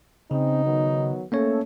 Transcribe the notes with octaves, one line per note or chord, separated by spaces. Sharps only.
C#3 C4 C#4 D#4
D#3 F#3 B3
A3 A#3 C#4 A4 C#5